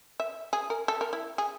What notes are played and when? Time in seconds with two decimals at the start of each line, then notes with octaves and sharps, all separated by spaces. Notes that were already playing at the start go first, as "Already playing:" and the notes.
0.20 E5
0.53 G#4
0.70 A#4
0.88 A4
1.01 A#4
1.13 E4
1.38 G#4